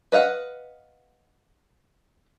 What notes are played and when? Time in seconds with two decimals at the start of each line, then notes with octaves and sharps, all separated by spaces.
0.12 B4 D#5 F5 F#5